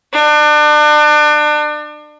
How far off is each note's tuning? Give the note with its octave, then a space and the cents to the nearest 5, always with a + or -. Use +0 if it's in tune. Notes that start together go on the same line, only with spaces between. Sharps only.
D4 +35